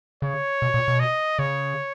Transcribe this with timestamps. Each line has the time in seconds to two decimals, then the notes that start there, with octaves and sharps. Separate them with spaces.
0.22 C#3 C#5
0.62 B2
0.74 A#2
0.88 B2
1.00 D#5
1.39 C#3 C#5